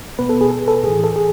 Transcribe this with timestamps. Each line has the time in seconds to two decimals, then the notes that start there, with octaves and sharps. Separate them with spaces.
0.19 B2 B3 B4
0.29 A4
0.41 G#4
0.51 A4
0.68 A4
0.83 A2 E3 G#4
1.04 A4
1.16 G#4